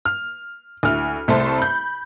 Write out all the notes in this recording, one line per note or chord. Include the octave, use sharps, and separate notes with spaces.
F6
D2 E4 F6
C2 A3 C5 A5
B5 G6